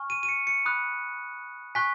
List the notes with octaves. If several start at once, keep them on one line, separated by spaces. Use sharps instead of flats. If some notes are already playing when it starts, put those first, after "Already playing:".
Already playing: G#5 C#6 F6
D#7
D#7
C#7
C#7
B5 D#6 F#6
G#5 C#6 F#6 B6